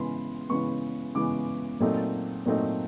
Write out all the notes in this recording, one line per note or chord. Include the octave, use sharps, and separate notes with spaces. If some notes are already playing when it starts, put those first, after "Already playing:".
Already playing: C#3 E3 G#3 B3 B5 C6
C#3 E3 G#3 B3 C#6
C#3 E3 G#3 B3 D6
A#2 F#3 A3 C4 D#4
A#2 F#3 A3 C4 D#4